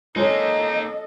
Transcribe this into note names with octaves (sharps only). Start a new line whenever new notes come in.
G#3 A#3 D#4 A4 C#5 D#5